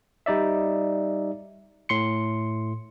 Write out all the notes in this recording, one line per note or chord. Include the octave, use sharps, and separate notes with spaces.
G3 D#4 D5 E5
A2 C6 C#7